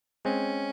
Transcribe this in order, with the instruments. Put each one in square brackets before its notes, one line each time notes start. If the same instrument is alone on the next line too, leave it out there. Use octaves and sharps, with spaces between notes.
[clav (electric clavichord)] G#3 C4 [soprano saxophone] C#4